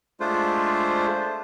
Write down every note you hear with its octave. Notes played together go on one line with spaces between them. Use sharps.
G#3 A3 D4 F4 C5